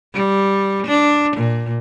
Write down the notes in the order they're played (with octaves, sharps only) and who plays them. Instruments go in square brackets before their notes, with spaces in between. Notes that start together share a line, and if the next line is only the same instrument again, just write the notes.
[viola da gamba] G3
D4
A#2